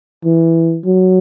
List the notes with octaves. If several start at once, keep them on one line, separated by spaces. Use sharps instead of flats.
E3
F#3